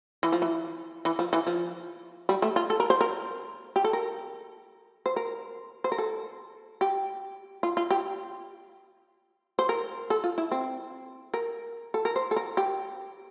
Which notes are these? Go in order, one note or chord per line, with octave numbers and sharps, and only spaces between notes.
E3
F3
E3
E3
F3
E3
F3
G3
A3
F4
A4
A#4
C5
A#4
G4
A4
A#4
C5
A#4
C5
A#4
A4
G4
F4
F4
G4
C5
A#4
A4
F4
E4
C4
A#4
A4
A#4
C5
A4
A#4
G4